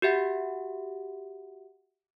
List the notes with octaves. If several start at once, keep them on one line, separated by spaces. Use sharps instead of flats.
F#4 G4 E5 F#5